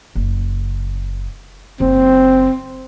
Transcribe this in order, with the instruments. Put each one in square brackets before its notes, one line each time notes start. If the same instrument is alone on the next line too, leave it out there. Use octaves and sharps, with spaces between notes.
[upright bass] F#1 C#3
[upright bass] F#1 [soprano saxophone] C4